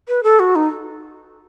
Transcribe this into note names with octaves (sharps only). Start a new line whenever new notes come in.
B4
A4
F#4
D#4